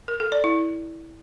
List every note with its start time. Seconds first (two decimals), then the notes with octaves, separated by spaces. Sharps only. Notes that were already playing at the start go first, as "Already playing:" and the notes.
0.08 A#4
0.20 A4
0.32 D5
0.44 E4